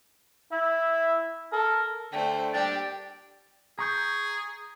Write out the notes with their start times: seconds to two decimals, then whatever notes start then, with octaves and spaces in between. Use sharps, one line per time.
0.52 E4 E5
1.52 A4 A#4
2.12 D3 A3 C5 G5
2.53 A#2 G3 D4 G4 A6
3.79 G#4 A#5 C#6 G6